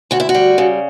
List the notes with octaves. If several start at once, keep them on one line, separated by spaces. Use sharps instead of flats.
D2 F#4
E4
F#4
G3
C#3